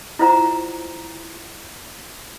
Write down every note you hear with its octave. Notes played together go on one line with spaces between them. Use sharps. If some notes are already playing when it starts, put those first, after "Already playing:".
E4 F4 C5 F#5 A#5